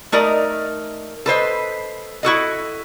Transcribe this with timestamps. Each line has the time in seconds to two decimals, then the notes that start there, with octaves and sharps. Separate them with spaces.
0.12 A3 D#4 A#4 D5 D#5
1.26 A4 B4 C5 D#5
2.23 E4 F#4 A4 D#5